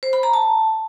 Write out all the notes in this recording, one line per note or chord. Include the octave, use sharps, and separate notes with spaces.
C5
B5
A#5
A5